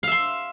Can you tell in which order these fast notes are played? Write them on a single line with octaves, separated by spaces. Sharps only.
F5 E5 C6